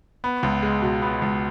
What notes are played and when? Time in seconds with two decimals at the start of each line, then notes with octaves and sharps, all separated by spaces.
0.24 B3
0.43 C#2
0.63 G#3
0.82 B2
1.02 B3
1.22 C#2